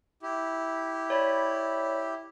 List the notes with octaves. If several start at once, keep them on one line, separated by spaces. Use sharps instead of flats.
E4 G4
C#5 D5 B5